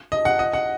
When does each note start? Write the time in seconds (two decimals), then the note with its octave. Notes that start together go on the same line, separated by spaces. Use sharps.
0.12 D#5
0.25 F#5
0.39 D#5
0.53 F#5